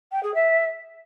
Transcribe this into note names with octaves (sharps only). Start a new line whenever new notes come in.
G5
G#4
E5